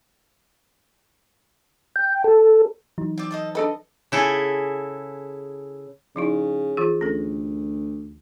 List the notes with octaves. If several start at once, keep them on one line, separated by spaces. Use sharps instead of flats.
G5
A4
E3 F#3 D#4
C4 D5
A4 C5 D#5
D4 A4 B4 D#5
C#3 E4 G#4 A4
C#3 F3 D#4 E4
E3 F4 G#4
D2 C#4 A4